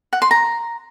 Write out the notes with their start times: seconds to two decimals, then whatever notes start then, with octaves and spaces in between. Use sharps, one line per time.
0.13 F#5
0.22 C6
0.31 A#5